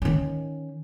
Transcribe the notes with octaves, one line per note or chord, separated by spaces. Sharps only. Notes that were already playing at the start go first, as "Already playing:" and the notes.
D#3 C#4